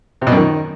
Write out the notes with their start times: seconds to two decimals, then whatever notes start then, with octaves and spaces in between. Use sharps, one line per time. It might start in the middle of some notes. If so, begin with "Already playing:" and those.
0.22 C3
0.27 B2
0.32 F#2
0.37 D#3